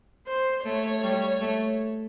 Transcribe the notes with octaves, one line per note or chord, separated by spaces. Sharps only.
C5
A3 C#5
G3
A3